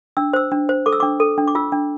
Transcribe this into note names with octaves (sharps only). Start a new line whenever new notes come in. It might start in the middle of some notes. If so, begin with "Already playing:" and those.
D4 E6
C5 E6
D4
C5
A4 D6
E6
D4 D6
A4
D4
D6
F4 E6
D4